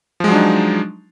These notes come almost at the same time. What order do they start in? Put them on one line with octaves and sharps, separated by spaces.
F3 G#3 F#3 D4 D#4